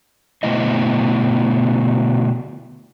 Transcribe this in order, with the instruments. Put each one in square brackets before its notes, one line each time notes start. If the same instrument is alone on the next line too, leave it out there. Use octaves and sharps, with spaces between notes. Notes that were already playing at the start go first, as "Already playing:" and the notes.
[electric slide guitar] B2 D3 A3 E4 D#5